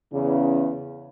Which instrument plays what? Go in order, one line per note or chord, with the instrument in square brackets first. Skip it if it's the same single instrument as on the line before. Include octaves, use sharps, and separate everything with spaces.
[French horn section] E2 C#3